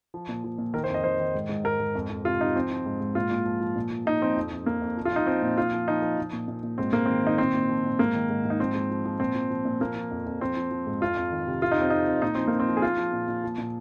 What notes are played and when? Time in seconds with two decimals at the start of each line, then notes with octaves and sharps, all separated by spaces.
0.14 F3
0.29 A#2
0.44 F3
0.58 A#2
0.73 D#3 A#4
0.84 C5
0.90 F2 D#5
1.04 D#3 C5
1.20 D#3
1.35 G#2
1.49 G#2
1.64 G#2 A#4
1.80 G#2
1.95 F2
2.10 F2
2.24 C3 F4
2.40 C3 D#4
2.55 F3 C4
2.71 F3
2.86 G#2
3.00 G#2
3.15 A#2 F4
3.31 A#2
3.45 F3
3.61 F3
3.76 A#2
3.91 F3
4.06 A#2 D#4
4.22 F3 C4
4.36 F2
4.51 F2
4.66 F2 A#3
4.82 F2
4.97 F3
5.05 F4
5.12 F3 D#4
5.27 F3 C4
5.42 A#2
5.58 F3 F4
5.73 F3
5.88 F3 D#4
6.02 F3
6.18 F3
6.33 A#2
6.48 A#2
6.63 A#2
6.78 G#2 C4
6.93 G#2 A#3
7.06 D#3 C4
7.23 D#3 D#4
7.38 A#2 C4
7.54 A#2
7.69 F3
7.85 A#2
7.99 G#2 A#3
8.14 D#3
8.30 G#2
8.45 G#2
8.50 D#4
8.59 F3 C4
8.75 G#2
8.90 F3
9.05 F3
9.20 A#2 C4
9.35 F3
9.50 F3
9.65 A#2
9.80 F3 A#3
9.96 F3
10.11 F2
10.26 F2
10.41 F3 C4
10.56 F3
10.71 F3
10.87 G#2
11.01 F2 F4
11.17 F2
11.32 D#3
11.47 C3
11.62 C3 F4
11.72 D#4
11.76 F2 C4
11.90 F2 D#4
12.07 F2
12.22 A#2 D#4
12.35 F3 C4
12.48 F3 A#3
12.60 C4
12.68 F3
12.77 G#4
12.82 F3 F4
12.98 F3
13.13 A#2
13.28 A#2
13.44 F3
13.58 A#2